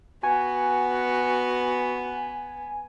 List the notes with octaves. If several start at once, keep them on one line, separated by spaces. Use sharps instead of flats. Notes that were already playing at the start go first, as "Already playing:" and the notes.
B3 F#4 G#5